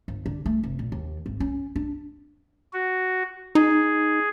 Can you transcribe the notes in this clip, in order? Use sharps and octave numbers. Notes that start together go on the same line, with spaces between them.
G1
D3
A3
F1
A#1
D#2
G#1
C#4
D4
F#4
D#4 G#4